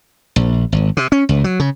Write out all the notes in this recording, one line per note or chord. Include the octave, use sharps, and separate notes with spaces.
A#1
G#1
C3
C#4
C#2
F#3
C#3